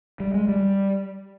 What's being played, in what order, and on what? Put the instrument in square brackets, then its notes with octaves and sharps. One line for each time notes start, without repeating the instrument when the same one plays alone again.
[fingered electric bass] G3
G#3
G3